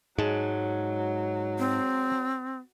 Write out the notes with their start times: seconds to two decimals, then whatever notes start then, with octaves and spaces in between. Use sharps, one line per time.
0.19 G#2 F#3 G#3 A5
1.59 C4